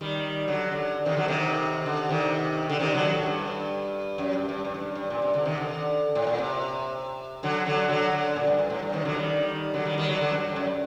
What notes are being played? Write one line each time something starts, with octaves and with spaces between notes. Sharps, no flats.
D#3 G3
D3 F#3
D3
C3 D#3
D3 F#3
C3 D#3
D3
C3 D#3
D3
C3 D#3
D3 F#3
A2
G2
F#2
G2
G2
G2
A2
G2
G2
A#2
C3
D3
C3 D#3
D3
A2
A#2
C3
D3 F#3
D3 F#3
D3 F#3
D3
A#2
G2
G2
A2
G2
C3 D#3
D3 F#3
D#3 G3
D3 F#3
D#3 G3
D#3 G3
D3 F#3
D3 F#3
G2
G2
F#2